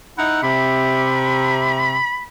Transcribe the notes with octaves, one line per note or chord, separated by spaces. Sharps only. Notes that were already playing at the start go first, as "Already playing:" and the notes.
D#4 E4 F#5
C3 B5